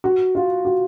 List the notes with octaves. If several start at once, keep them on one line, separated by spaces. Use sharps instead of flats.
F#4
F4
F#4